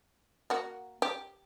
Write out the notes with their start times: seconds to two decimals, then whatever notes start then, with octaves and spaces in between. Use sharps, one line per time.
0.50 A#3 F#4
1.02 G4